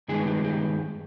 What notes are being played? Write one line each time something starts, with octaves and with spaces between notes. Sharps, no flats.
G2 D#3 G#3 B3 G#4
G4
G4